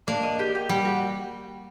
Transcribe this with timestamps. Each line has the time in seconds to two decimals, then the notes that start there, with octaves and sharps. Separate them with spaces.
0.07 A#3 D4
0.23 D#5
0.39 G4
0.55 G4
0.69 G3 G5
0.85 F#4